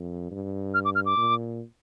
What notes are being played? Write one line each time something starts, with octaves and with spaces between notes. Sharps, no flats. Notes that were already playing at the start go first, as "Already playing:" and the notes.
Already playing: F2
G2
F6
D6
F6
D6
A#2